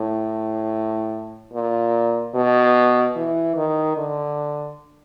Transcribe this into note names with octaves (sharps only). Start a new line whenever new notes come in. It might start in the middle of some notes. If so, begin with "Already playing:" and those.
Already playing: A2
A#2
B2
E3
D#3
D3